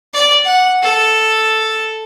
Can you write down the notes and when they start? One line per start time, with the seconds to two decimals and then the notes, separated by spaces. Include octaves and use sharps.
0.14 D5
0.45 F#5
0.83 A4